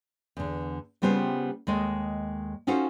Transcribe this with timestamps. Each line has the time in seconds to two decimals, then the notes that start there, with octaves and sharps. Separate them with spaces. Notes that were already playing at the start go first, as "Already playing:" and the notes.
0.37 E2 D3
1.02 C#3 G3 B3 F4 G4 C5
1.67 D#2 G#3 A4 D#5
2.67 C#4 D#4 F4 F#4 A4 C5